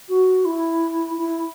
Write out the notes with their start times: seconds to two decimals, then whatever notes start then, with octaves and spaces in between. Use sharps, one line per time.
0.09 F#4
0.45 E4
1.18 E4